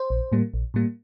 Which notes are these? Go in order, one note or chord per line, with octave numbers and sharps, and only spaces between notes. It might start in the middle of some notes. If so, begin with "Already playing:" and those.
Already playing: C5
A#1
A2 G3 A#3
A#1
A2 G3 A#3